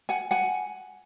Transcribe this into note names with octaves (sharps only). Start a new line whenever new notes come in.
F#5 G#5
F#5 G#5